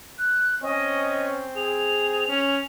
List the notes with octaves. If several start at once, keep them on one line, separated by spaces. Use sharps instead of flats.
F#6
C4 C#4 D#5
G#4 F7
C#4